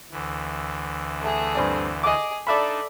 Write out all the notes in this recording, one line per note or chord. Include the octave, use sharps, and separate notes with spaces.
D2 E3
A3 G#4
G2 C4 D5
G#4 D#5 D6
D4 D#4 A4 D5 E5 B5